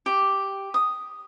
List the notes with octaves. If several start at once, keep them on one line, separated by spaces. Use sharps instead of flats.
G4
D#6